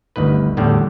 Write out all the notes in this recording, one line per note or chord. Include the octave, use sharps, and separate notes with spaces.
G1 D2 D#3 B4
E2 A2 D3 G3